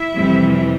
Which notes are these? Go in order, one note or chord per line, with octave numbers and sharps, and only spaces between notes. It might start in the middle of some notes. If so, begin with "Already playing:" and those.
Already playing: E4 E5
F2 C3 E3 G3